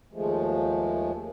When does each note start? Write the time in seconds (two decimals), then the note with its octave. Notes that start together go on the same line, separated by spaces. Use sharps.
0.13 D#2 F3 G#3 A3